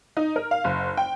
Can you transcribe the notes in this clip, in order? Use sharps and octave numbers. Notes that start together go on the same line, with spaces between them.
D#4
A#4
F5
F#1
G5